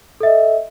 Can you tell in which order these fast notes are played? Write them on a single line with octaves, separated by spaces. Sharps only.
A4 E5 D#5